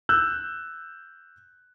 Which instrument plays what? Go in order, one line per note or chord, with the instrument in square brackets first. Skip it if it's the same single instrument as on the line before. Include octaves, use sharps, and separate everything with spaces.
[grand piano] E6 F#6 G6